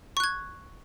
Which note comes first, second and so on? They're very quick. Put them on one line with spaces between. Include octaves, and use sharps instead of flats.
C#6 F#6 G#6